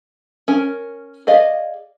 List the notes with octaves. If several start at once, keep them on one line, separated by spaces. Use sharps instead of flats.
C#4 A#4
G#4 D5 D#5 F5